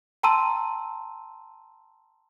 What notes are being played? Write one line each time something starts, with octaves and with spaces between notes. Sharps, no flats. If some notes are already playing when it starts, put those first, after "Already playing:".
G5 A5 A#5 C6 E6 D#7